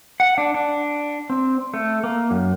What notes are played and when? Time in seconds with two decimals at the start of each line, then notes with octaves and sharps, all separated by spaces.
0.20 F#5
0.38 D4
0.54 D4
1.30 C4
1.74 A3
2.04 A#3
2.31 F#2